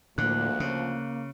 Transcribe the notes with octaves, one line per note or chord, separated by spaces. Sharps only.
D2 A2 D3 F3 A#3 F#6
C#3 A#3